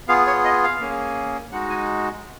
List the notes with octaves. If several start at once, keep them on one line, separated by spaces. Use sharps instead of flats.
B3 F4 G#4 F5
C#5
D#5
F5
A#3 C#4 G#4
G#3 D#4 F#4 F#5
G#5